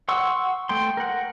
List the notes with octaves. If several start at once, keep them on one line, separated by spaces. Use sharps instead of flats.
F#5 C6 C#6 E6
A3 G5 C6
A#4 F#5